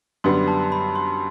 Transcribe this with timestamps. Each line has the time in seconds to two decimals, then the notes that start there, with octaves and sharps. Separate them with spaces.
0.24 F#2 D3 G3 B3 C6
0.48 A5
0.72 B5
0.96 C6